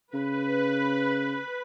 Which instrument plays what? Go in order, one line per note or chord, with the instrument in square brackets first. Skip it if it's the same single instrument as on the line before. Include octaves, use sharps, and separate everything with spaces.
[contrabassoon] C#3 [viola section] B4